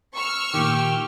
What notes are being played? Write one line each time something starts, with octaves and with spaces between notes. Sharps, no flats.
C#6 E6 F6
A#2 D#3 G4